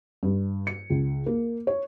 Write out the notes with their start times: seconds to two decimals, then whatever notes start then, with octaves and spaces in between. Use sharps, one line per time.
0.23 G2
0.67 C#7
0.90 C#2
1.26 A#3
1.67 C#5